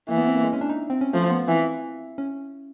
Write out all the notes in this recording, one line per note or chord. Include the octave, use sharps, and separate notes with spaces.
E3 A#3
B3
C4
A#3
G#3
C#4
D4
D#4
C4
C#4
F3 A3
B3
E3 C4
C#4